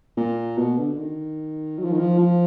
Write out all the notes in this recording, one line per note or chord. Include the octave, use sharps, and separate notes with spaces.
A#2
B2
D3
D#3
F#3
F3
D#3
F3
F3